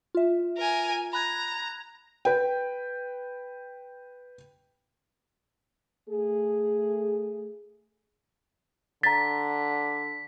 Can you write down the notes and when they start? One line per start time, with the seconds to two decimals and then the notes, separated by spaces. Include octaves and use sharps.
0.15 F4 E5
0.58 A#4 G#5
1.13 A#5 B5 F#6 G#6
2.25 B4 G5
6.09 A3 G#4
9.03 D3 A#5 A6 B6